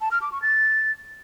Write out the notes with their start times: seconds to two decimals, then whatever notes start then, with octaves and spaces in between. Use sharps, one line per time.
0.01 A5
0.11 F6
0.22 D6
0.32 C#6
0.42 A6